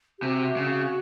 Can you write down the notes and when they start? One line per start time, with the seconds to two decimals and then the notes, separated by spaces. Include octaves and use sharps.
0.19 G4
0.23 C3 F#4
0.57 C#3